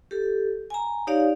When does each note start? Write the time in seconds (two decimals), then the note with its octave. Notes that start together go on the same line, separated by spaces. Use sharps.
0.11 G4 A4
0.70 G#5 A#5
1.07 D#4 G4 C#5 D5 F5